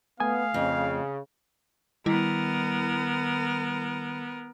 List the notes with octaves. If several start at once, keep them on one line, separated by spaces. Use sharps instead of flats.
A3 B3 F5 G#5 D#6
F2 C#3
D#3 G3 B3 E4 A#4